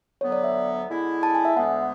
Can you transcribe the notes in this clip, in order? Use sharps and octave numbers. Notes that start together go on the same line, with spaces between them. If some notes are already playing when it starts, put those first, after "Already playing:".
D2 D3 F#3 B3 C#5
D5
E5
D3 G#3 B3 E4
A5
G#5
E5
D2 D3 G#3 B3 F#5